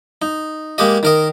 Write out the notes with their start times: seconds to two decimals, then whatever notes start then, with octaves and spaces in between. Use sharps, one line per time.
0.22 D#4
0.78 G#3 A#3 G4 D#5
1.03 D#3 A#4 D#5